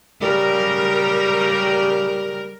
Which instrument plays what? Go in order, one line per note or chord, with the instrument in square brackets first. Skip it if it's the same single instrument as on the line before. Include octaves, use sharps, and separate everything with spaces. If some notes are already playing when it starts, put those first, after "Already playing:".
[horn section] C#3 G3 [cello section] A#4